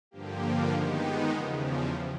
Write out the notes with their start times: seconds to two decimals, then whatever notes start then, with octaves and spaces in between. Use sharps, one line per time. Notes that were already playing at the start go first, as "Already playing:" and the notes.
0.11 G2 D3 F3 A#3 G4
0.71 D#3 G#3 B3 D#4 G4
1.30 E2 C#3 F3
1.61 G4